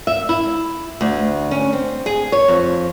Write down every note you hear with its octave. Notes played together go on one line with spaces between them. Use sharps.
E5
E4
D2
C#4
C4
G#4
C#5
F2